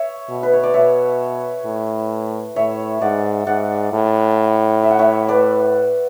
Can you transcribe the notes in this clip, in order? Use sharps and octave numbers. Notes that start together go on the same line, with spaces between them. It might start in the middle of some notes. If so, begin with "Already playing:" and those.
Already playing: C#5 E5
B2
B4
C#5
D5
B2 C#5 E5
A2
A2 C#5 E5
G#2 D5 F#5
G#2 D5 F#5
A2
E5
F#5
C#5 E5
B4 D5